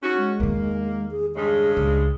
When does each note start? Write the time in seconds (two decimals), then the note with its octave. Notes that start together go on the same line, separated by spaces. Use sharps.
0.03 C#4 D#4 F#4
0.17 G#3
0.40 E2 D#3 A#3
1.11 G#4
1.35 G2 C#3 G#3 G#4
1.77 C#2 G#4